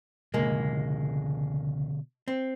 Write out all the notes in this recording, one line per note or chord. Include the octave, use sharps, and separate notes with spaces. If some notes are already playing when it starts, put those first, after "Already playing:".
C#2 B2 D3 G#3 A#3
C4